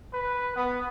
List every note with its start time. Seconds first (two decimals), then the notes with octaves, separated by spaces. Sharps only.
0.13 B4
0.56 B3